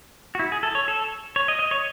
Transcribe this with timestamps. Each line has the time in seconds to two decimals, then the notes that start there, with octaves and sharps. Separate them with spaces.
0.35 F#4
0.39 E4
0.52 G#4
0.63 A4
0.75 C#5
0.88 A4
1.36 C#5
1.48 D#5
1.59 D#5
1.71 C#5